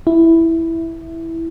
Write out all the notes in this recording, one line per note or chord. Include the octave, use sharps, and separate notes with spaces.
E4